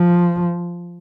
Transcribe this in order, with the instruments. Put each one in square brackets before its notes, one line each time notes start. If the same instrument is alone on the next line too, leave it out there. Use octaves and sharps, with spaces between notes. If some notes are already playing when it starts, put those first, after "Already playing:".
Already playing: [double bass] F3